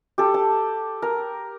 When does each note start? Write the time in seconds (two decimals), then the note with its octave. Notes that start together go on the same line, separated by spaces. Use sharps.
0.18 G4 A4
0.34 A5
1.02 A#4